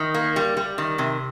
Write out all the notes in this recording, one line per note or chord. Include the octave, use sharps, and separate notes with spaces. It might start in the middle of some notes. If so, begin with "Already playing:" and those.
Already playing: D#3
A#3
G3
G3
D#3
C3